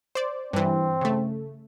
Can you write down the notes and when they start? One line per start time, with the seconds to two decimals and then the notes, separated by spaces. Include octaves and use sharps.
0.15 C5 D5
0.53 G2 E3 C4
1.01 C#3 A3